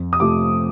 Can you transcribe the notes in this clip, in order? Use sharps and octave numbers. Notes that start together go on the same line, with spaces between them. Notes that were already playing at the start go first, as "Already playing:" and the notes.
Already playing: F2
D#6
C3 F3 A3 D6